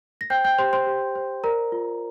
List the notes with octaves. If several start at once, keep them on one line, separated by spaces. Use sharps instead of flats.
A#6
C5 G5 G6
G5 G6
G4 C5 C6
C5 C6
G4
C5
A#4 D5 A#5
F4